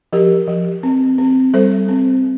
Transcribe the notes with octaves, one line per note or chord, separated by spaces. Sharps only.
F3 G4 A#4
F3
C4
C4
G3 A4 C5
C4